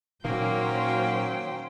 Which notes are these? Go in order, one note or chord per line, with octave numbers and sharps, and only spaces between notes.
A#2 D#3 F#3 A#3 C#4 C5 G5